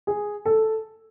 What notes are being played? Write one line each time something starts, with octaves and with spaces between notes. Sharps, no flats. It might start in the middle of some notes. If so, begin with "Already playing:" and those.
G#4
A4